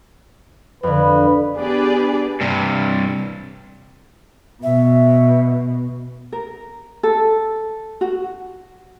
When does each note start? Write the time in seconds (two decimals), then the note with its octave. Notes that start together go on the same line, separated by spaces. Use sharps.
0.83 F2 D3 B4
1.55 B3 D4 G4 G#4 B4 D5
2.41 G2 C3
4.63 B2 E5
6.32 A#4
7.03 A4
8.01 F#4